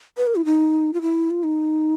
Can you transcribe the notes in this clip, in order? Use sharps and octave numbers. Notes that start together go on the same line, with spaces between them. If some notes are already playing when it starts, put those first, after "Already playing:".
B4
A#4
E4
D#4
F4
E4
F4
D#4